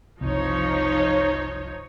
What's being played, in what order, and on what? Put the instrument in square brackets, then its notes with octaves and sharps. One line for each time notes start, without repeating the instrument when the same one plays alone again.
[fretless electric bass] F#1 C2 [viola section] F3 D#4 C#5